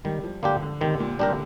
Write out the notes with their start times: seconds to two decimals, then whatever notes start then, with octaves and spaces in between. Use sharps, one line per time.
0.05 D#3 G3
0.24 F3
0.43 D3 A#3 D4 G4
0.62 D3
0.81 C3 D#3
1.00 A#2
1.19 C3 G3 D4 G4 A#4
1.29 D3